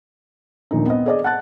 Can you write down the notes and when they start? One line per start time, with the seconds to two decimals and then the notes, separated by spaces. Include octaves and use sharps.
0.71 A#1 D#2 A#2 D#4
0.86 B3 C4 D#5
1.06 G#4 D5 D#5
1.24 F#5 A5 F#6 A6